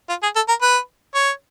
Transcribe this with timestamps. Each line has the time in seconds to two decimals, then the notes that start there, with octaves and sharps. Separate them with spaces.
0.09 F4
0.23 G#4
0.36 A4
0.49 A#4
0.62 B4
1.14 C#5